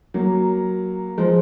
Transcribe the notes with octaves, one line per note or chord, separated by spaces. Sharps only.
F#3 A#3
F3 G#3